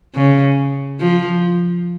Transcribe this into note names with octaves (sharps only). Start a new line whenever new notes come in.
C#3
F3